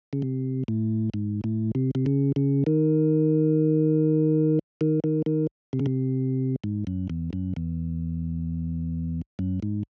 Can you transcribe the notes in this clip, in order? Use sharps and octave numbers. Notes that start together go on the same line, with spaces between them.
C#3
C3
A2
G#2
A2
C3
C3
C#3
C#3
D#3
D#3
D#3
D#3
C3
C#3
C3
G#2
F#2
E2
F#2
E2
F#2
G#2